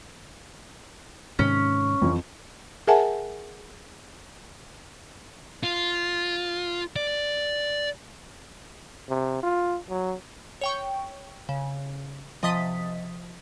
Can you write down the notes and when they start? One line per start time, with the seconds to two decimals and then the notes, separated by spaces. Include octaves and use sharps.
1.39 G#2 C3 D#3 C#4
2.02 F2 E3
2.87 G#4 A#4 E5 F#5 G#5 A5
5.63 F4
6.96 D5
9.09 C3
9.43 F4
9.90 F#3
10.61 C#5 G5 C#6
11.49 C#3
12.43 C3 F3 D#5 D#6 A6 B6